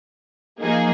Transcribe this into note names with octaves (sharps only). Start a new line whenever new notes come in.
F3 A#3 D#4 G#4